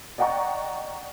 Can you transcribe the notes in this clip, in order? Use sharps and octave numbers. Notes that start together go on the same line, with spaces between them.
D5 D#5 F#5 G5 A#5 C#6